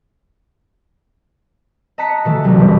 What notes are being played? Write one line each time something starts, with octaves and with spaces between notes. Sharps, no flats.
D#5 A5 A#5 F#6 B6 C#7
B2 D3 E3 A3 A4
F#1 B1 C3 F#3
F2 G#2 G3